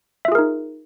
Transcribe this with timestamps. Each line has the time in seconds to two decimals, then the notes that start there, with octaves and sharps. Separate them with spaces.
0.25 E5
0.28 F4
0.32 G#4
0.35 A#4
0.38 D#4